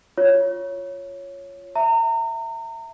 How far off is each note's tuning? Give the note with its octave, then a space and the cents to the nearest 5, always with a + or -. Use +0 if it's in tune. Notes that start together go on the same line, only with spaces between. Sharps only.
F4 +0 C#5 +0
E5 +0 A#5 -35